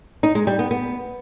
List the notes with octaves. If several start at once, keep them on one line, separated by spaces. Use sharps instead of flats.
D#4
G#3
G3
B3
B3